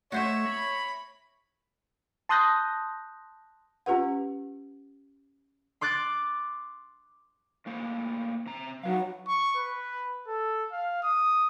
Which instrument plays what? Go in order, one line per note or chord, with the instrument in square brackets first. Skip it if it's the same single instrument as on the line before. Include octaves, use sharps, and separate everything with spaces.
[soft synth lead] A3 [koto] F#4 C5 D#5 [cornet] C#5 [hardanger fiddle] E5 C#6
[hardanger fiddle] B5 [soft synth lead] A#6
[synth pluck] A5 C6 D#6 F#6 G6 A#6
[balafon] C#4 F4 G4 B4 F#5
[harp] C6 D6 F#6 A6 D7
[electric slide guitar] A2 A#3 C5
C3 A#5
[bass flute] F#3 [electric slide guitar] D#4 B4 F5
[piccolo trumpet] C#6
B4
A4
F5
D#6